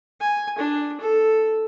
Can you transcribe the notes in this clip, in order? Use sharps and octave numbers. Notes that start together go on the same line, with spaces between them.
G#5
D4
A4